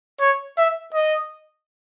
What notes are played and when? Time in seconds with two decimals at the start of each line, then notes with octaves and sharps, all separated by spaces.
0.20 C#5
0.57 E5
0.94 D#5